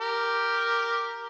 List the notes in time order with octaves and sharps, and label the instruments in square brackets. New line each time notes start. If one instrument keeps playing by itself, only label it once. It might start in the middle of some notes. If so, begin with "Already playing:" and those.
[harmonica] G4 A#4